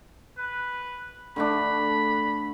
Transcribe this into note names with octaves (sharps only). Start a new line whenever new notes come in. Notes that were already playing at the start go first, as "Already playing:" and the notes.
B4
D3 A3 D4 B5